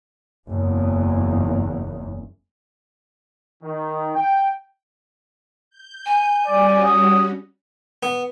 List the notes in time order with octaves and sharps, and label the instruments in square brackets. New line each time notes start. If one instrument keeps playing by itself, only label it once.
[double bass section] F#1 E2
[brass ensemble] D#3
G5
[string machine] G6
[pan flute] G#5
[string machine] G3 C#4 F#4 [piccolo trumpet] D5
[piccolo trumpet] D#6
[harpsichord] B3